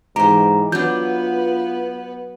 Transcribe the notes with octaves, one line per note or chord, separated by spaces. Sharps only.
G#2 E3 G4 A#5
F#3 B3 D4 F4 B4 G6